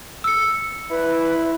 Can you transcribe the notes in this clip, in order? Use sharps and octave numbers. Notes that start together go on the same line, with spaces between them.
E6 C#7
E4 B4